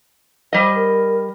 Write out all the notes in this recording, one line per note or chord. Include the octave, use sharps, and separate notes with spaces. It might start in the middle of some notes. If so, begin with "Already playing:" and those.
G3 C5 D#5
A#4